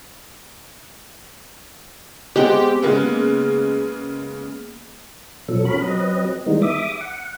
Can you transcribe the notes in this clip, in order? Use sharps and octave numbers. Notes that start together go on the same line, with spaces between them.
G#3 B3 C4 G4
C#3 G#3 A#3 B3
B2 F3 F#3 A4
C#4 F#4 A#4 B5
F#3 C4 B4 D#5
D#3 E3 G3 G#3 B3 D#4
E5 D6 D#6
F#5